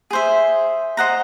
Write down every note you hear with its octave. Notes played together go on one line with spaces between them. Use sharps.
G#4 C5 E5
C5 D#5 F#5 A#5